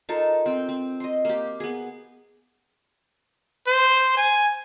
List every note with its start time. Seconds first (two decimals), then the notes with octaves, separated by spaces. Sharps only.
0.09 D#4 F4 A4 A#4
0.46 C4 G5
0.69 C4
1.00 D#5 C6
1.25 A#3 G4
1.60 B3 G#4
3.67 C5
4.17 G#5